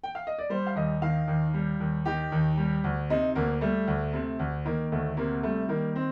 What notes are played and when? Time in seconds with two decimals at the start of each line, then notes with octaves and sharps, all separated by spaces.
0.04 G5
0.15 F5
0.27 D#5
0.39 D5
0.50 G3 C5
0.67 F5
0.75 D#2 D#5
1.02 D#3 F5
1.28 D#2
1.54 G3
1.80 D#2
2.06 D#3 G4
2.32 D#2
2.57 G3
2.84 D2
3.10 C3 D#4
3.35 D2 A#3
3.61 G3 A3
3.87 D2
4.13 C3
4.39 D2
4.65 D#3 A#3
4.92 D2 A3
5.17 C3 A#3
5.43 G3 A3
5.69 D#3 A#3
5.96 C4